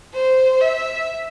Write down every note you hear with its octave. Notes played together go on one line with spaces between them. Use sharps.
C5
E5